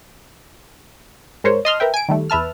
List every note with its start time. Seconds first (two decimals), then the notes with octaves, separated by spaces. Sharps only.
1.44 G#2 A#4 C5 C#5
1.65 D#5 A5 C6 D#6 F6
1.80 A#4 B4 E5 G5
1.94 G#5 D7
2.09 D#3 G3 A3
2.30 E2 B4 E5 A5 F6